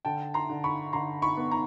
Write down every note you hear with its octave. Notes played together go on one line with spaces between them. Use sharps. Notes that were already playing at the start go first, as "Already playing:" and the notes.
D3 G5 A5
A#5 C6
D3
B5 C#6
D3 A#5 C6
B5 C#6
B3
A#5